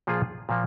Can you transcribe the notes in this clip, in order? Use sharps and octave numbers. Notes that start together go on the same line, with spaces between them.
A#2 F3 A#3 F4 G#4
A#2 F3 A#3